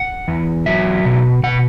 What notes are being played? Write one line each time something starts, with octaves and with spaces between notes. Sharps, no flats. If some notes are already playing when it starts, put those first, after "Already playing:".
Already playing: F#5
E2
F#3 E5
B2
B2 F#5